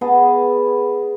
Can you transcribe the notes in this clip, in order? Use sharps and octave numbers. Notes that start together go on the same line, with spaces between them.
B3 G#4 D#5 A5